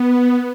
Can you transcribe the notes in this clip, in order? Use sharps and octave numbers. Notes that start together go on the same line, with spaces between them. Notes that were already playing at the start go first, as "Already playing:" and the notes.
Already playing: B3